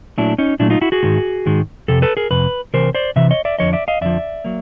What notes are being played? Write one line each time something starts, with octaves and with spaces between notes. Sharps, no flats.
A#2 F#3 A3 D4 E4
C#4 D#4
A#2 F#3 A3 D4 E4
D#4 F4
E4 F#4
F#4 G#4
G#2 D#3 G#3
G#2 D#3 G#3
F2 C3 A4
A4 B4
G#4 A#4
F2 C3 B4
C3 E3 A#4 C5
C5 D5
C3 E3 E5
C#5 D#5
D5 E5
F2 D3 F3 C#5 D#5
D5 E5
D#5 F5
F2 D3 F3 D5 E5
F#3 A#3